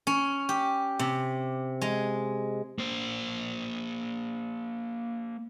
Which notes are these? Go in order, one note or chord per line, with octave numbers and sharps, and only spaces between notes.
C#4
G4
C3
G#3
A#3 C5